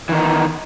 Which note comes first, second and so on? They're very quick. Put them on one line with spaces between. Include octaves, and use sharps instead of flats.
E3 D#3 D#4 B3